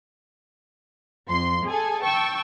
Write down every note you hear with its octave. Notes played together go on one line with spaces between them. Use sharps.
F2 C6
G#4 A4 G#5
G5 A5 C#6 E6